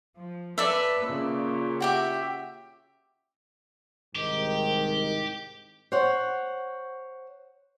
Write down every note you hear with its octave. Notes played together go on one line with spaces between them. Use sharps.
F3
A4 B4 D5 E5 E6
A#2 C#3
F#4 G4 E5
C2 G#2 D#3 G4
C5 C#5 F#5